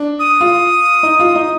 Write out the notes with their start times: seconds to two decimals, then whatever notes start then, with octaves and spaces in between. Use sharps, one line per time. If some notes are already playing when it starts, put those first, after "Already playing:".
Already playing: D4
0.19 D#6
0.41 F4
1.03 D#4
1.20 F4
1.36 D#4